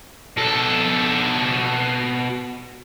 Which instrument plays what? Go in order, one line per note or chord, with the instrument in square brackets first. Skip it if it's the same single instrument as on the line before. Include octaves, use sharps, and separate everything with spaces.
[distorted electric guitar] B2 A4